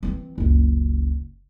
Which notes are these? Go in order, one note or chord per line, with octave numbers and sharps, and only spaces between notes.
E3 C4
F#1 C#2